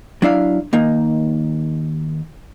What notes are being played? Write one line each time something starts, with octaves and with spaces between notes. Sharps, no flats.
F#3 D4 E4 F5
D#2 A#3 D#4